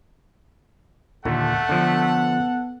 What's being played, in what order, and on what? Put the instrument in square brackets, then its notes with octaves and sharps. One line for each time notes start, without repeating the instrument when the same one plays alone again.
[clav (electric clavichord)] D#2 A#2 D3 [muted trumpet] A3 [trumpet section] A4 F#5
[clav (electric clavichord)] D3 F3 [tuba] B3